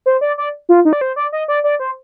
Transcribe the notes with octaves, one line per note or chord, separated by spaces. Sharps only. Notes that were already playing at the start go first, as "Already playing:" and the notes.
C5
D5
D5
F4
D#4
D5
C5
D5
D#5
D5
D5
C5